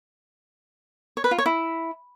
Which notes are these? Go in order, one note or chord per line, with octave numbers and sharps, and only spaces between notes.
C#5
B4
F4
C#5
E4